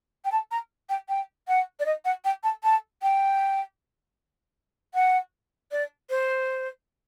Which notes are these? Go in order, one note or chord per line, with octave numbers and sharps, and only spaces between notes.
G5
A5
A#5
G5
G5
F#5
D5
D#5
F#5
G5
A5
A5
G5
F#5
D5
C5